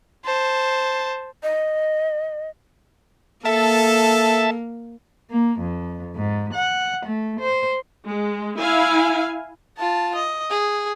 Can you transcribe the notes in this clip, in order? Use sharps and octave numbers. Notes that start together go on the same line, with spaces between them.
C5 A5
D#5
A#3 A4 E5 A5
A#3
F2
G#2
F#5
A3
C5
G#3
E4 F5 G#5
F4 A5
D#5
G#4